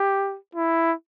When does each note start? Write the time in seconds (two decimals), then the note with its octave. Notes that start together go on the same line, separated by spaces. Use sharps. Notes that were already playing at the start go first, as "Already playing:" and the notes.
Already playing: G4
0.55 E4